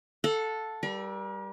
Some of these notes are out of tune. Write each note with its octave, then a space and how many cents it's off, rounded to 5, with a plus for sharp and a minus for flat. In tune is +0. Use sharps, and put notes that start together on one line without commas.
A4 +0 F#5 -45
G3 +0 A#4 +45